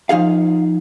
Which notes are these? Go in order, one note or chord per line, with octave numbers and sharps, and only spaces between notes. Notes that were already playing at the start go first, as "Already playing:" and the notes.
F3 D#4 G#4 F5